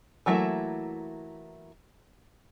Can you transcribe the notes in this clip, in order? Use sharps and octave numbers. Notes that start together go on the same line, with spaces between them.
E3 F#3 A3 A#3 E4